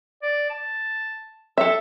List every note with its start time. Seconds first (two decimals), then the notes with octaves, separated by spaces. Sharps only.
0.22 D5
0.50 A5
1.58 A4 E5 E6